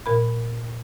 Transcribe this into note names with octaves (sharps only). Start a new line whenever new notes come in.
A#2 A#4 B5